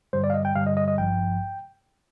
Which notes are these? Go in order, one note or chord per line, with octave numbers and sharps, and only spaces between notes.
G2 D3 G3 C5
D5
F5
D#5
G5
G2 D3 G3 F5
D#5
D#5
D#5
G#1 G2 F3 G5